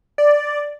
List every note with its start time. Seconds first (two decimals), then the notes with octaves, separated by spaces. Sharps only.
0.18 D5